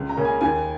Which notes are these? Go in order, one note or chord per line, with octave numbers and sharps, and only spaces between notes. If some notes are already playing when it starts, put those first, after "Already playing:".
Already playing: C#2
A#5
C#3 A#3 C#4
G#5
D#2 G#5